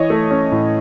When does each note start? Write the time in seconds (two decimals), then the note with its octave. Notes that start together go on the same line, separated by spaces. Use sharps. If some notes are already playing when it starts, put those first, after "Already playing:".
Already playing: E3 C#5 D#5
0.10 A3
0.31 C#4
0.52 A2